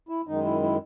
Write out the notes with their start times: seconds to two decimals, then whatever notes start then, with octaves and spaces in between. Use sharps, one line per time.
0.09 E4
0.27 F#2 D#3 G#3 D#4
0.45 E4
0.63 E4